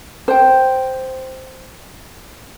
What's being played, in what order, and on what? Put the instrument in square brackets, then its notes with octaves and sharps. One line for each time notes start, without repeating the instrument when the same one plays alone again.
[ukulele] C5 G5